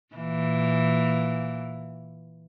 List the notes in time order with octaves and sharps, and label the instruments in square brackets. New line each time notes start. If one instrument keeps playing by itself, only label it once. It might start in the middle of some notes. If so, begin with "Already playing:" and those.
[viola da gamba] A#2 E3 A#3